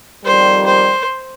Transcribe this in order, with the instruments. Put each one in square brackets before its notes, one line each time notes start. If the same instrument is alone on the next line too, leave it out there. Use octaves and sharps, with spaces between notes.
[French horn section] F2 D#3 G3 [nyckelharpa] C5
[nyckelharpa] C5